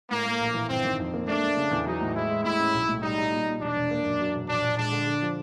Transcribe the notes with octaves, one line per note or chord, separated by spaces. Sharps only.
A2 A#3
A2
A#1
E3
G1 C4
D#3
F2
A#3
A3 D4
A3
C#3
E2
F#3 D#4
A2
G#3 E4
G#3
A2 E4
C#4
B1
A2
G3 D#4
G3
A#2
A#2
E1 D4
E1
A#3
F#2
F#3
E1
A#1 D4
A#1
G#3 D4
D3
D3
F3